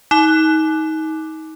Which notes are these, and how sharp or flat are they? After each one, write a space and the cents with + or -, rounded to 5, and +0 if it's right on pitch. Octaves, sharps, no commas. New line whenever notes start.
D#4 +30 D6 +5